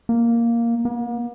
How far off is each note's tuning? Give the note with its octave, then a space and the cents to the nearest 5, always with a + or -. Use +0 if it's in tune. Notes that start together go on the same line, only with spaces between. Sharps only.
A#3 +0
A#3 +45